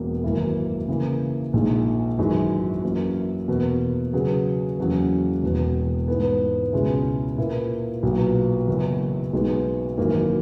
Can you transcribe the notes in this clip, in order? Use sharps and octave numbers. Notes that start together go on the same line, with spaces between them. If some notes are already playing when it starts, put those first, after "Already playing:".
Already playing: E1 E2 B2 A#3
G#1 F#2 E3 A#3 E4
C#3 E3 A#3
A#1 A#2 G#3 D#4
G#1 F#2 E3 G#3 D#4
F#2 E3 A#3 C#4
E2 B2 A#3
C#3 F#3 C#4 G#4 B4
F#1 E2 C#3 F#3 C#4
E1 E2 B2
G#2 E3 B3
C#2 B2 G#3 C#4 E4
A#2 A#3 E4 B4
B1 A#2 F#3 B3
F#1 F#2 E3 B3 F#4
B1 B2 G#3 B3 D#4
G#1 F#2 E3 A#3 D#4